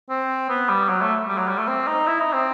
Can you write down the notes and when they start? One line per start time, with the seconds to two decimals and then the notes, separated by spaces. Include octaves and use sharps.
0.10 C4
0.49 B3
0.69 G3
0.89 F#3
1.02 A3
1.28 G3
1.38 F#3
1.48 G3
1.58 A3
1.68 C4
1.87 D#4
2.07 E4
2.20 D#4
2.33 C4